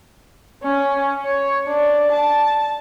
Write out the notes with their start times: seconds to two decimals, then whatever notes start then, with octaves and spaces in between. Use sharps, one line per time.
0.63 C#4
1.25 C#5
1.67 D4
2.12 A5